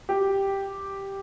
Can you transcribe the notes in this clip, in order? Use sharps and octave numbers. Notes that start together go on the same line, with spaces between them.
G4